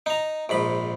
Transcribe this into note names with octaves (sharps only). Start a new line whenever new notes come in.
D#4 A#5
A#1 G#2 B5